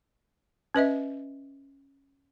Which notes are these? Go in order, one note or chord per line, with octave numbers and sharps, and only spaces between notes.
C#4 B4 D#5 E5